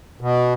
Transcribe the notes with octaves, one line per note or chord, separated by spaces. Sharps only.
B2